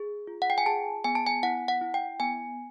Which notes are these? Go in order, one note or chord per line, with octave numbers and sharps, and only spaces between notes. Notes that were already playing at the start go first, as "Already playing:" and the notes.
Already playing: G#4
F4
F#5
G5
G#5
G#4 A5
B3 G#5
A5
G#5
E4 F#5
F#5
E4
G5
B3 G#5